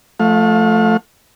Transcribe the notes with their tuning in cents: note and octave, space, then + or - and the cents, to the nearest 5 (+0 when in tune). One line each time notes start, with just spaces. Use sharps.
F3 +0 A3 +0 F5 +40